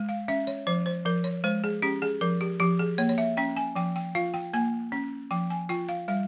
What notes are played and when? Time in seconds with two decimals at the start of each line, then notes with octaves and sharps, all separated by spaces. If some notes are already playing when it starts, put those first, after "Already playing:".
Already playing: G#3
0.09 F5
0.28 C#4 E5
0.47 C#5
0.67 F3 C5
0.86 C5
1.05 F3 A#4
1.24 C#5
1.44 G#3 C5
1.64 G#4
1.82 C#4 G4
2.02 G#4
2.21 F3 A#4
2.41 G4
2.60 F3 G4
2.79 G#4
2.98 A#3 C#5
3.09 C#5
3.18 E5
3.37 C#4 G5
3.57 G#5
3.75 F3 G5
3.96 G5
4.15 F4 F5
4.34 G5
4.53 A#3 G#5
4.92 C#4
5.31 F3 G5
5.50 G#5
5.69 F4 G5
5.89 F5
6.08 G3 F5